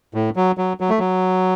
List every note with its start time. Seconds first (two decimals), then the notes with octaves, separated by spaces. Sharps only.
0.14 A2
0.36 F#3
0.58 F#3
0.80 F#3
0.90 A3
0.99 F#3